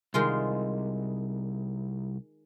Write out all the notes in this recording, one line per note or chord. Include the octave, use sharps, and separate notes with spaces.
C2 D#3 G#3 F4